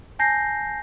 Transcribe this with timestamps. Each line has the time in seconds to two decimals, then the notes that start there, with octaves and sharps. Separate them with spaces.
0.19 G#5 A5 G6 A#6 C7